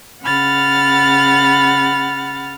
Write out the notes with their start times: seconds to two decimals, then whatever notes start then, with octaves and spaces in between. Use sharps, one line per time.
0.21 C#3 F#5 B5 F6 A6